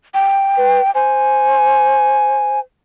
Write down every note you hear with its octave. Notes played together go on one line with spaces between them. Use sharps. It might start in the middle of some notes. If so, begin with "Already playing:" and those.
G5
B4
C5 G#5